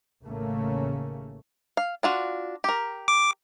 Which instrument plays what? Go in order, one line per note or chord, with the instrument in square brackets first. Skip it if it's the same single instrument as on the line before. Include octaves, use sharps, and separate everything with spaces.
[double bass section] A1 D#2 C#3 A3 A#3 C#4
[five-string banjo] F5
D4 F4 F#4
G4 A#4
[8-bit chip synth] D6